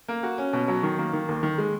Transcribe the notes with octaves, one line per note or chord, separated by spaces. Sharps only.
A#3
F#4
C#4
B2
F#3
D#3
A#3
D#3
D#2
D#3
G#3